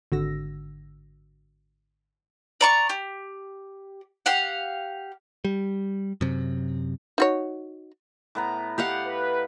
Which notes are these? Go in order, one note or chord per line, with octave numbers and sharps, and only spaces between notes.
G#1 D3 F#4 E6 A#6
D5 A#5 C#6
G4
G4 F5 F#5
G3
F#2 C3
D#4 F#4 C#5
A2 B3 A#5
G4 D#5 F5 F#5
B4